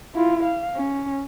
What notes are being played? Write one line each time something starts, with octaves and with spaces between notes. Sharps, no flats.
E4 F4
F5
C#4